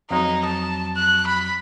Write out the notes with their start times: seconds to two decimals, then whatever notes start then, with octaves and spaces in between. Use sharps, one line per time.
0.11 F2 F#3 D#4
0.46 A5
0.97 F#6
1.27 B5